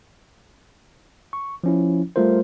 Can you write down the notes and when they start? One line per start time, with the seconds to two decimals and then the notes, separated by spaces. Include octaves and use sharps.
1.33 C#6
1.64 F3 C#4 E4
2.16 G3 A3 F4 A#4 C5